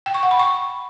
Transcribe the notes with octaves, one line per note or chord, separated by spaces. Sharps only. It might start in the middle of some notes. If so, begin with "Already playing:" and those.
G5
C#6
F#5
B5
C#6